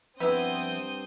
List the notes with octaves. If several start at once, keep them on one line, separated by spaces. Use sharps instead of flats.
G2 F3 B3 C4 E4 F#5 D#6 G6